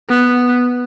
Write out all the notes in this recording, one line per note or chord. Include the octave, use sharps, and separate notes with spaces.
B3